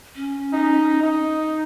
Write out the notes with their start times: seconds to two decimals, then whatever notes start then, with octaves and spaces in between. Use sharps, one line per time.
0.16 C#4
0.53 D#4
1.02 D#4